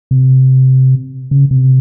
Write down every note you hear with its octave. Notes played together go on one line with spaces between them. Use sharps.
C3
C#3
C3